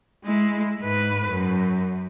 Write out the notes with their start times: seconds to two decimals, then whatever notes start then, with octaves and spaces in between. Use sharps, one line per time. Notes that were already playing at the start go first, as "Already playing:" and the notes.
0.25 G#3 E4
0.80 G#2 B4
1.29 F#2